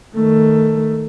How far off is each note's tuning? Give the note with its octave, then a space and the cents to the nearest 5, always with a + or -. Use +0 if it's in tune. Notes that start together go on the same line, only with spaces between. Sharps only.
D#3 +0 A3 +10